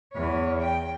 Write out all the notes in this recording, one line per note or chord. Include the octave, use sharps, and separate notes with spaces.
E2 C#5
G5